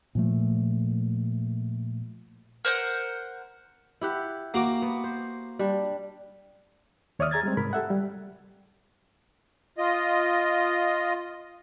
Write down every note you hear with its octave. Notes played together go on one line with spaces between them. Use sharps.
A#2 F3 A3
A#4 C5 F#5 G6
E4 G4 F#5
A#3 F#4 D6
B3
C5
G3 D4
D#2 C#5 D5 E5 D#6 F6
G#4 A#5 G#6 A6
G3 G#3 C4
G#2 C3 A#4 B5
G4 A4 E5 F#5
G3
F4 D#5